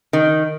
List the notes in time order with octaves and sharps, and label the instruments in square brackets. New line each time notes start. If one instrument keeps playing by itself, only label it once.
[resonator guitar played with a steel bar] D#3